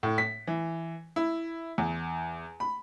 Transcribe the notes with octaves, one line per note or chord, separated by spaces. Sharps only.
A2
B6
E3
E4
E2
B5